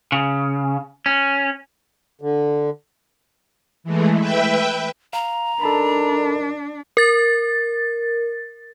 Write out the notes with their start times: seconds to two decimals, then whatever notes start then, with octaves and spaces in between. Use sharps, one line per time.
0.12 C#3
1.06 C#4
2.21 D3
3.84 E3 G#3 A3
4.19 B4 E5 G5
5.13 F5 A#5
5.61 F#2 D4 D#4 A4 A#4 A5 B5
6.97 A#4 A6